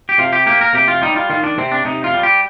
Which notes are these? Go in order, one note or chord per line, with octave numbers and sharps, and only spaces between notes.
G4
C3 F4
G4
A#3 G4
A#4
C3 G4
F4
G3 D#4
F4
D#3 F4
D4
C3 C4
D4
C3 D#4
F4
G3
G4